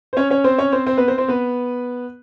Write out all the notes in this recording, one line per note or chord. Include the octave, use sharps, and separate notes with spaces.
C5
C#4 C#5
C#4 C#5
C4 C5
C#4 C#5
C4 C5
C4 C5
B3 B4
C4 C5
C4 C5
B3 B4